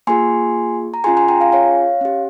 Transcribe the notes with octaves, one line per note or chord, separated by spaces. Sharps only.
A#3 F4 G#4 G#5 C6
A#5
C#4 F4 G#4 G#5 C6
G#5 C6
G5 A#5
F5 G#5
C#5 F5
C#4 G4